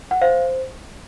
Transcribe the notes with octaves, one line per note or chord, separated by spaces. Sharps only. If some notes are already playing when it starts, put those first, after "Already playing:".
F#5
C5 F5